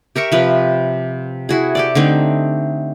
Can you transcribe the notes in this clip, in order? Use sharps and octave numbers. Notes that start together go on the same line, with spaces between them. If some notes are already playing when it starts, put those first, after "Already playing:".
G4 A#4 E5 C#6
C3 F3 B4
E4 F#4 G#4
G4 A4 D5
D3 A3 C4 D#4